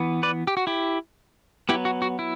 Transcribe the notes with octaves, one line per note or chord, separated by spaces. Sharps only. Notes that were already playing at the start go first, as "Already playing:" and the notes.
Already playing: E3 B3
B4 D5
G4
F#4
E4 G4
F#3 B3 E4 G4
F#4
F#4
E4